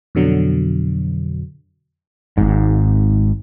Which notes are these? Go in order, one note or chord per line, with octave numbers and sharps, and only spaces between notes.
F2 B2 D3 F#3
G#1 G#2